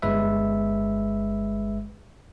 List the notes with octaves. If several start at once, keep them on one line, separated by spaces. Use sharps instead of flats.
G1 G#3 B4 E5